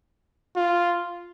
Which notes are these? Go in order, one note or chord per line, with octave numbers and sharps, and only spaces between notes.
F4